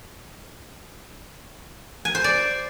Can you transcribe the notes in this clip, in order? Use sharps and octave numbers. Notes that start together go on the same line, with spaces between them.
G#5
C5
D5